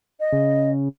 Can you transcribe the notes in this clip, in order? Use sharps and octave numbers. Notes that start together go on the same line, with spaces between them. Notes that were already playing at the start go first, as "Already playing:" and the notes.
D#5
C#3